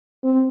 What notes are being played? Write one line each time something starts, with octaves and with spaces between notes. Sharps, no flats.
C4